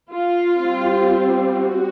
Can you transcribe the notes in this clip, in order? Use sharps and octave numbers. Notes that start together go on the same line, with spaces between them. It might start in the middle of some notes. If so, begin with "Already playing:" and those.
F4
G3 C4
F#4